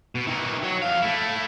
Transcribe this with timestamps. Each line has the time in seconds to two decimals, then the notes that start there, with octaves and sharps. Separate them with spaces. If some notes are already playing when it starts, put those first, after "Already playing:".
0.15 B2
0.27 D#3 E3
0.63 F#3
0.82 F2 F5
1.03 A3 E4